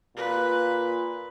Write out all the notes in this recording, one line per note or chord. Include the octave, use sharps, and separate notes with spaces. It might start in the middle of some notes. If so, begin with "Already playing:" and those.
A#2 B4